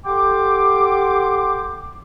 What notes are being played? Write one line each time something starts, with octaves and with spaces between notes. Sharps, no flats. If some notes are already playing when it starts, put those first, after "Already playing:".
G4 A4 F#5 G5 C6 D6